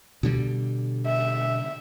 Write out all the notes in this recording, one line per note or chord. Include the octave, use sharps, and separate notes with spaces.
B2 D3 G3
E5